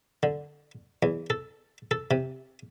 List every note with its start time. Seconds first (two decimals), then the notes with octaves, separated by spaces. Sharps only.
0.23 D3
1.03 E2
1.30 A4
1.91 A4
2.11 C3